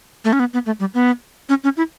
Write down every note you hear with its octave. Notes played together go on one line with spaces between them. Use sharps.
A3
C#4
B3
B3
A3
G3
B3
C#4
C#4
E4